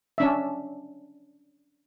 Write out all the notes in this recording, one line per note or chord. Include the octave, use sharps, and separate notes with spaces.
C#4 D4 E5